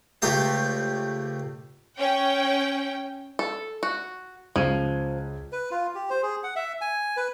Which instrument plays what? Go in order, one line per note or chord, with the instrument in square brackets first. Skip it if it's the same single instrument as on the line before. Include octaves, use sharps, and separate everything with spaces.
[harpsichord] C#2 A3 G4 C5
[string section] C#4 G5
[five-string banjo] A4
F#4
[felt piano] C#2 G#6 D#7 [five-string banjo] F3
[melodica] B4
F4
G4
C5
G#4
F#5
E5
G#5
B4